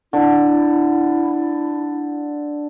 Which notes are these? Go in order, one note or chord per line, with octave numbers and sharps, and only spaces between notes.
D3 E4